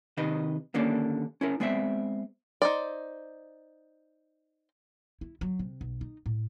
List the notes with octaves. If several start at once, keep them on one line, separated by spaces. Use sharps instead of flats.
C3 D#3 B4 D#5
D#2 D3 A#3 C#4 D4 D5
C#4 E4 A#4
G#3 B3 C4 D5 E5
D#4 C5 D5
E4
F#3
C3
B1
D#4
A2